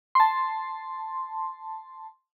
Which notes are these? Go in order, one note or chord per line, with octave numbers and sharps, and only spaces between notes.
A5 C6